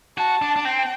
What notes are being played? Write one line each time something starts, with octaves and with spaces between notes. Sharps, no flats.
F#4 A5
D4
D4
C4 G5